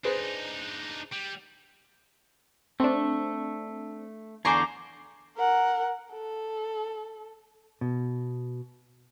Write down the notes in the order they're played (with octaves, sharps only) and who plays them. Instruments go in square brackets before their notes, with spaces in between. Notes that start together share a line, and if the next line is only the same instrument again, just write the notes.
[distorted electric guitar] D4 D#4 [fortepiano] G#4 B4 C5
[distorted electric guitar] G3
[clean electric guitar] A3 [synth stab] C4 D4
[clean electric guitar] E2 D3 C5 [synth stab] G#5 C#6 C7 [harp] A#5 D6
[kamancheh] A#4 F#5
A4
[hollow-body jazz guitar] B2